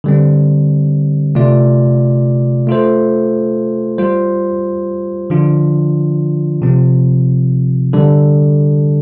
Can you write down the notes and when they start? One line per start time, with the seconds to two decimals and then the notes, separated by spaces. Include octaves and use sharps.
0.04 D3 G3 C4
1.35 C3 A3 F4 D5
2.67 A3 F4 A4 C5
3.98 G3 F4 C5
5.30 D3 F3 D4 F4
6.62 C3 F3 C4
7.93 D3 G3 D4 A4